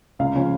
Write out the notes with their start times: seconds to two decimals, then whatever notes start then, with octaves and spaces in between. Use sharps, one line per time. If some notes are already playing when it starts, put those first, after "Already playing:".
0.19 C#2 F5
0.35 C#3 F3 C#4